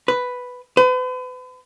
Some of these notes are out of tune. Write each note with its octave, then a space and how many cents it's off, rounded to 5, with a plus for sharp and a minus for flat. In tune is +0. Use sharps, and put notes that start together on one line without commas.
B4 +5
B4 +40